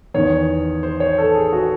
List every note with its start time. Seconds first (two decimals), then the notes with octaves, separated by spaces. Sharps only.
0.14 E2 D#3 C#5
0.83 C5
1.00 C#5
1.18 A4
1.35 G#4
1.52 F#4